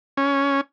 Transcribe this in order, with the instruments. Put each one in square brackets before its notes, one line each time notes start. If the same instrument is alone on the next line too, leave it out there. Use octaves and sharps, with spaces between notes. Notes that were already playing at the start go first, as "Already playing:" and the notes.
[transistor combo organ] C#4